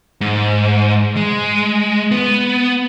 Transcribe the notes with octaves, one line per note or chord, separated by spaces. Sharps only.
G#2
G#3
B3